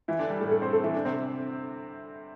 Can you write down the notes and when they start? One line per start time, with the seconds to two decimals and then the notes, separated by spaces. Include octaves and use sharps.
0.08 E3 E4
0.19 D3 D4
0.30 G3
0.41 A2 A3
0.51 A3 A4
0.62 C4 C5
0.73 A3 A4
0.84 E3 E4
0.94 D3 D4
1.05 C3 C4